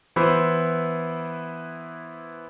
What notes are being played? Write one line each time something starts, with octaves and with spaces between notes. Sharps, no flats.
E3 B3 E4 C5